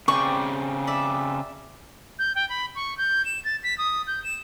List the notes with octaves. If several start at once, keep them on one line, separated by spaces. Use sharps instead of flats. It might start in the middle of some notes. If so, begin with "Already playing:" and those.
C#3 C4 D5 G5 C#6
D5 E5
G6
G5
B5
C#6
G6
E7
A6
B6
D#6
G6
E7